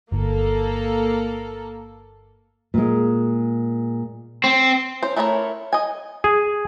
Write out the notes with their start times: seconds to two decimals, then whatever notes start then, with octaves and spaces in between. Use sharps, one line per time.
0.12 G1 A#3 A4
2.74 A#2 G#3
4.44 C4
5.03 C#4 C5
5.16 A3 D4 E4 A#4 C#5
5.73 D#5 G#5
6.24 G#4